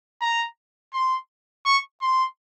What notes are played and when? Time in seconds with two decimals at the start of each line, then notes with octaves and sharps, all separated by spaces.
0.21 A#5
0.93 C6
1.66 C#6
2.01 C6